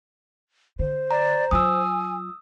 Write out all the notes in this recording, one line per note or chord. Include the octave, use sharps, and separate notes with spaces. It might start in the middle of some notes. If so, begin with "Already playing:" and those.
D3 C5
D5 A#5
F#3 F4 G#5 D#6 E6